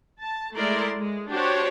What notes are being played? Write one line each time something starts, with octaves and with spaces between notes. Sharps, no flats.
A5
G#3 A3 E4 A#4 D5 C6
G#3
D4 F#4 G4 C5 C#5